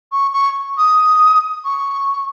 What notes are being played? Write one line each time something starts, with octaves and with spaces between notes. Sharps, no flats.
C#6
C#6
D#6
C#6